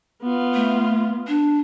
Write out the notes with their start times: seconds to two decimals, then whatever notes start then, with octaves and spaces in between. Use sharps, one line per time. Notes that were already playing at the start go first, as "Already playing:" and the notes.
0.23 B3 F4
0.54 A3
1.28 D4